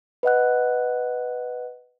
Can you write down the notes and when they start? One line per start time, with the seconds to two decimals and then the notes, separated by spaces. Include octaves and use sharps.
0.23 B4 D#5 F#5 F#6